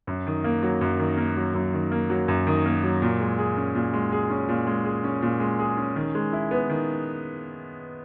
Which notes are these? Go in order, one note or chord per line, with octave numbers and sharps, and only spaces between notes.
F#2
D#3
A#3
F#3
F#2
D#3
A#3
F#3
F#2
D#3
A#3
F#3
F#2
D#3
A#3
F#3
A#2
G#3
G#4
C#4
A#2
G#3
G#4
C#4
A#2
G#3
G#4
C#4
A#2
G#3
G#4
C#4
D#3
G#3
E4
B3
D#3